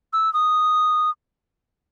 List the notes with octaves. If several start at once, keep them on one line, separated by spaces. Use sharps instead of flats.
E6
D#6